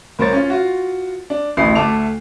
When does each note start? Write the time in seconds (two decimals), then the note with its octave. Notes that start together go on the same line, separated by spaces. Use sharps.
0.19 C2 A#4 C5 C#5 A6
0.33 C#4 F4
0.50 F4 F#4
1.30 D4
1.57 D1 A1 A2 B5 C7
1.75 D2 A3 A5 D6 F7